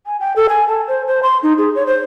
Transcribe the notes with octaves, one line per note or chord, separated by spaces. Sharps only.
G#5
G5
A4
G#5
A5
C5
C5
C6
D#4
G#4
C#5
C5